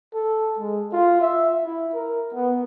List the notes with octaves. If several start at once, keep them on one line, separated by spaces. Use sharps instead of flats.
A4
G#3
F4
E5
E4
A#4
B3